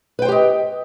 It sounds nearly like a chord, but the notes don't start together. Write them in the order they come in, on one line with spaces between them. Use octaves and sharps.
B4 G5 C5 G4 D#5